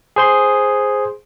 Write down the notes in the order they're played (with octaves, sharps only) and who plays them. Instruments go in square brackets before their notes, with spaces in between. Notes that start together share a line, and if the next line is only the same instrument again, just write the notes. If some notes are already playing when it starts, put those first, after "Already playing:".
[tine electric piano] G#4 C5 C6